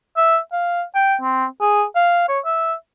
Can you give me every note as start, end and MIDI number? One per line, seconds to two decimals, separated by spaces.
0.17 0.39 76
0.52 0.82 77
0.95 1.15 79
1.21 1.45 60
1.61 1.84 68
1.95 2.27 77
2.28 2.39 73
2.45 2.74 76